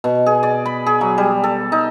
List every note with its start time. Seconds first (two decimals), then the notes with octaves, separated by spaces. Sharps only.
0.04 B2
0.26 G#4
0.43 D5
0.66 B5
0.86 G#4
1.01 F#3
1.18 G3
1.44 A4
1.72 D#4